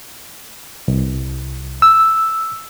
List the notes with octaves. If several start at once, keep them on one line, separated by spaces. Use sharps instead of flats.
C2
E6